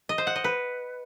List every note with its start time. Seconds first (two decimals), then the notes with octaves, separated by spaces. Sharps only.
0.09 D#5
0.18 C5
0.27 F#5
0.36 D#5
0.44 B4